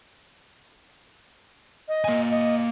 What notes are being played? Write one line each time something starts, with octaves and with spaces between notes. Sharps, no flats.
D#5
A#3 G#5
D#5